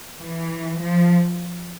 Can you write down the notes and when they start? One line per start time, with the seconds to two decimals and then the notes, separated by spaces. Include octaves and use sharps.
0.19 E3
0.81 F3